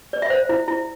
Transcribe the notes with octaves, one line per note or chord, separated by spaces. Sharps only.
D5
E5
C5 F5
E4
E4